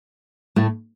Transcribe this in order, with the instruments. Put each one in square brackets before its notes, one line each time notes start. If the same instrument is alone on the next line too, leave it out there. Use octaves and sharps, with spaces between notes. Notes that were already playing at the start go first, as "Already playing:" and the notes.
[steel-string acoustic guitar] A2 A3